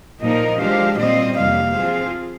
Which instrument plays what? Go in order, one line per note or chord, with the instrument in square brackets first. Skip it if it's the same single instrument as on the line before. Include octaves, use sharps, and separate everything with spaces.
[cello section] A#2 F3 A#3 D#4 A#4 [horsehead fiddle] D#5
[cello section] F3 G#3 D4 G4 C5 [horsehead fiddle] F5
[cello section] A#2 G3 C4 F4 C5 [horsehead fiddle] D#5
[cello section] F2 C3 G3 A#3 [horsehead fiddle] F5
[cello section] F3 C4 F4 G#4 C5